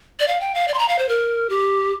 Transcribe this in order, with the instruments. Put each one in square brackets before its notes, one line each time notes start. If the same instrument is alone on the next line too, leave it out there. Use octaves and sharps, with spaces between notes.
[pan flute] D5
F5
G5
F5
D5
C6
A#5
F5
C5
A#4
G4